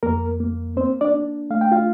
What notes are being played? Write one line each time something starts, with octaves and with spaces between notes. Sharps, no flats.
F2 A#3 A#4
A#3
A#3 C4 C5
D4 D5
D4
A3 F5
G5
F4 F5